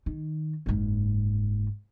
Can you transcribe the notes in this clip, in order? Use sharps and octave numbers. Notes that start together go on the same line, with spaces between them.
D#3
F#1 G#2